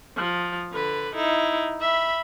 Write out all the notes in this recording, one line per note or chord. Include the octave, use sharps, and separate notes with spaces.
F3
D3 B4
D#4 E4
E5 B5